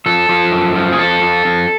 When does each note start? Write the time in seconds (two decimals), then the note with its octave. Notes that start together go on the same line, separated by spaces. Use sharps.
0.06 F3 A4
0.29 F3
0.52 F#2
0.76 F3
0.93 G#4
0.99 F2 A4
1.22 F2
1.45 F2